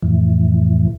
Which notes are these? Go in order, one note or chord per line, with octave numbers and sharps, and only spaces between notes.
F2 A2 E3